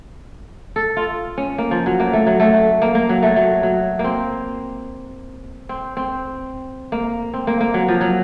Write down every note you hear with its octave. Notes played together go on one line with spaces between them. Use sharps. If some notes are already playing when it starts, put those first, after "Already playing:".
A4
F4
C#4
A#3
F3
F#3
A#3
A3
F#3
A3
A#3
A#3
F#3
A3
F#3
F#3
A#3
C4
C4
C4
A#3
C4
A#3
A#3
F#3
F3
F#3